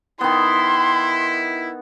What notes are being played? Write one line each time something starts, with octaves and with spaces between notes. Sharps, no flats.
D#3 B3 E4 C6